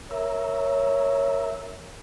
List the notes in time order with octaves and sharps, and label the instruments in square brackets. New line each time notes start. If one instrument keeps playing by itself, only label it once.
[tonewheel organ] A#4 E5 [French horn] C#5